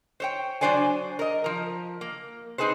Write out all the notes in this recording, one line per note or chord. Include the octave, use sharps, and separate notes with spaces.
C5 C#5 G5
F#3 C4 D4 C5 D5 G#5
A#4 D#5
F3 A#4
A#3
C4 D#4 G#4 B4 C5